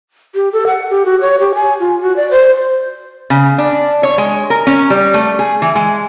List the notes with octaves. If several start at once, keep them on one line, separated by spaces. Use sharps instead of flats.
G4
A4
F#5
G4
F#4
C#5
G4
G#5
F4
F#4
D5
C5
C#3
D4
C#5
G#3
A#4
C#4
G3
A3
G#4
E3
G#3